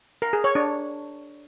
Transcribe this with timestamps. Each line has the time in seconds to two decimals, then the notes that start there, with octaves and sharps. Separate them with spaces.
0.22 A#4
0.33 G#4
0.44 C#5
0.55 D4